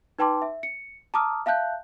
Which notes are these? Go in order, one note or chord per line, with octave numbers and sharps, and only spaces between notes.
D#4 B4 G5 A5 C6 D6
E5
C#7
A5 A#5 D6 D#6 F6
E5 F5 A5 F#6 G6